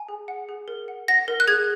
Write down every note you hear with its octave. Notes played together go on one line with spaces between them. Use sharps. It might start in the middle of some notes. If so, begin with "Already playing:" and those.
Already playing: G#5
G#4
F#5
G#4
A#4
F#5
F#5 A#6
A#4
F#6
G#4 G#6